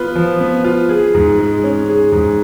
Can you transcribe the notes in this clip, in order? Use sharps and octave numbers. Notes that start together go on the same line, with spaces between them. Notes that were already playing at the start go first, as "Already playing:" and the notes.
Already playing: B3 F4 B4
F3
B3
F4
G#4
G#2
G#3
C#4
G#4
G#2